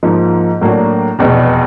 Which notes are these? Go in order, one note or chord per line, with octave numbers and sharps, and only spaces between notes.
G#2 F3 A#3 D#4
A2 F#3 A#3 D4 F#4
F1 E2 B2